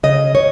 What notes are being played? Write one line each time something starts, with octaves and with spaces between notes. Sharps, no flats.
C#3 D#5
C#5